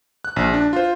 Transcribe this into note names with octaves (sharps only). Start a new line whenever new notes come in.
F#6
A#1
D4
F4 C5